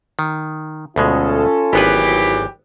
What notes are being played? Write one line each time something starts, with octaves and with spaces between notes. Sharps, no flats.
D#3
D2 B2 G#3 C#4 F4 A4
G#1 E3 F#3 B3 G4 B4